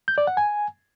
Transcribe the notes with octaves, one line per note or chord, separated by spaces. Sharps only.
G6
D5
F#5
G#5